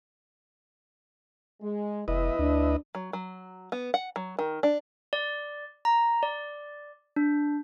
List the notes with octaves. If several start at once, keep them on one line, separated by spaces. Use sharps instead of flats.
G#3
F1 E2 E4 B4 D#5
D2 D4
F#3
F#3
B3
F#5
F#3
D#3
D4
D5
A#5
D5
D4